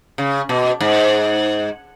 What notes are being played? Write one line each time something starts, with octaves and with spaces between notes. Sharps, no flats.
C#3
B2
G#2